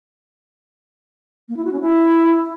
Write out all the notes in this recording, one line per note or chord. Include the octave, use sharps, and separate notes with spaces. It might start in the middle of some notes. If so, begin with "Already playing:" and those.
A#3
E4
F#4
C#4
E4